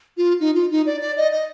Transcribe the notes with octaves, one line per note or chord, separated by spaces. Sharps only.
F4
D#4
F4
D#4
D5
D5
D#5
D#5